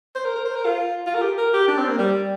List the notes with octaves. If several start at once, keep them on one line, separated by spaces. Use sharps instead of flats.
C5
A#4
A#4
C5
A#4
F4
F4
A#4
G4
A#4
G4
D4
C4
A#3
G3